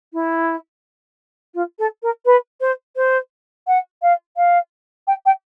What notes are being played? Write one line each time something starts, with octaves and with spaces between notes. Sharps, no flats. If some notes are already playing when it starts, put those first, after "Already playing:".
E4
F4
A4
A#4
B4
C5
C5
F#5
F5
F5
G5
G5